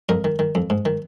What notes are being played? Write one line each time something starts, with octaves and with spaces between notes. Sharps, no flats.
F2 A#4 D#5
D#3
D#3
F2
G#2
D#3